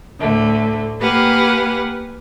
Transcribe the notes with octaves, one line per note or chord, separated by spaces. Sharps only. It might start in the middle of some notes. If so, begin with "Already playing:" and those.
D2 A2 D3 A3
A#3 G4 B4 F5 F#5 G#5